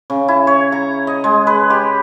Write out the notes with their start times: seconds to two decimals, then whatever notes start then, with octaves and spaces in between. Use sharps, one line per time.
0.10 C#3
0.28 E4
0.47 C#5
0.72 A#5
1.07 D#5
1.24 G#3
1.47 B4
1.70 G4